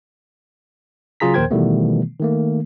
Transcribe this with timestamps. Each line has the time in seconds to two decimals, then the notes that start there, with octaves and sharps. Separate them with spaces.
1.20 C#3 F#3 F4 G#4 A#5 B6
1.34 A#1 D#2 A#4 C5 G5 G#6
1.51 B2 D#3 E3 G3 A3 B3
2.20 D#3 A3 A#3